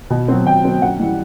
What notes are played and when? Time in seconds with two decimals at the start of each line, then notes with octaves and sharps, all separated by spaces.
0.10 B2
0.28 F#3 C4
0.46 B2 G5
0.64 F#3 C4
0.81 F#2 F#5
1.00 E3 G3